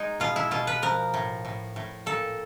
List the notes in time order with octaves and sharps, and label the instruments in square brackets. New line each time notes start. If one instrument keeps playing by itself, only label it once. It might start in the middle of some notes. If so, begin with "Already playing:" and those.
Already playing: [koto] G#3 D#4
B2 F4
E4
B2 F4
B4
F3 A#4
A2
A2
A2
A#2 A4